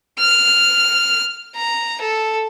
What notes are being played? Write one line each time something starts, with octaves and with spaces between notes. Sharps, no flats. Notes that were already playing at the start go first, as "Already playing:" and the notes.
F6
A#5
A4